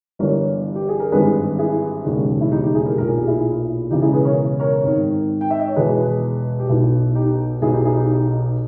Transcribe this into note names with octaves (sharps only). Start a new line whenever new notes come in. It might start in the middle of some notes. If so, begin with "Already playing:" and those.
G1 G2 E3 A#4 C#5
G4
G#4
A#4
G#1 G2 E3 G#4 B4
E4 G#4
E1 D#2 C#3 E3
E4
D#4 G4
D#4 G4
E4 G#4
G4 A#4
B1 A#2 A#4
G#4
G4
E4 G#4
E1 E2 C#3 E3 D#4 G4
E4 G#4
G#4 B4
A#4 C#5
A#4 C#5
G#1 G#2 D#3
G5
E5
D#5
C#5
E1 E2 B2 G#4 B4
G4
B1 B2 E4
D#4 G4
B1 B2 E4 G#4
D#4 G4
E4 G#4
D#4 G4